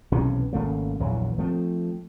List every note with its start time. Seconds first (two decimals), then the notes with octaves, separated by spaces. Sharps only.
0.12 B1 C3 E3 C#4
0.53 G#1 C#3 A3 A#3
0.99 A#1 E2 E3 F#3
1.38 F3 A3 C4